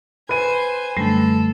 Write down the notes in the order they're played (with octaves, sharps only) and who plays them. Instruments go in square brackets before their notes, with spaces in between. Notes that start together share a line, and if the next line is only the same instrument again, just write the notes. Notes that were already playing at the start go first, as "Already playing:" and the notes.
[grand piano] B4 D#7 [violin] C5 G#5
[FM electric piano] F#2 D3 [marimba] G3 A3 [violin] A4